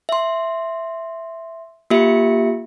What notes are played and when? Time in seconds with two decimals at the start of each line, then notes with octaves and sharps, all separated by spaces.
0.09 E5 C6
1.90 A#3 F4 G4 E5 C#7